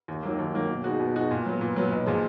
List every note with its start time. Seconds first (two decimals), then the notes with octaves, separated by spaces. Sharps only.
0.08 D#2
0.23 D#3 F#3 A#3
0.39 D#2
0.54 D#3 F#3 A#3
0.69 B2
0.84 G#3 D#4 F#4
1.00 B2
1.15 G#3 D#4 F#4
1.31 A#2
1.46 F#3 B3
1.61 A#2
1.76 F#3 B3
1.91 B1
2.06 A#2 F3 G#3